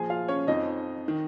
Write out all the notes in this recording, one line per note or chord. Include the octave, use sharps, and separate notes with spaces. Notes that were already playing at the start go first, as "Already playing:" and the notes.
Already playing: A#2 F3 G#4 G#5
F4 F5
C#4 C#5
F2 F3 D#4 D#5
D#3